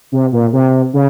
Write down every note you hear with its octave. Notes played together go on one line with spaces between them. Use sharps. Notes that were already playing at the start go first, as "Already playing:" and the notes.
C3
A#2
C3
C#3